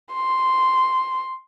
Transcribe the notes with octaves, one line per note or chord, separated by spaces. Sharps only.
C6